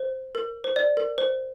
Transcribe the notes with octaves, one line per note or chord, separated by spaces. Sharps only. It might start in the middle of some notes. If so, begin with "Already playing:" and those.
Already playing: C5
A#4
C5
D5
A#4
C5